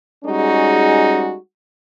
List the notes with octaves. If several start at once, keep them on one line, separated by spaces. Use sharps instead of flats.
G3 G#3 C#4 D#4 F#4 G#4